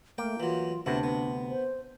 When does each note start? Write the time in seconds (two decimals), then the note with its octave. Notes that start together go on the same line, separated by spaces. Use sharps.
0.18 A3 A#3 G5
0.40 E3 F#3 F4
0.86 D2 C3 B3 D4 E4
1.03 B3
1.48 C5